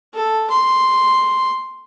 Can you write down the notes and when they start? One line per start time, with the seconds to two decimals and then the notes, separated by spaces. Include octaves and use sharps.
0.14 A4
0.50 C6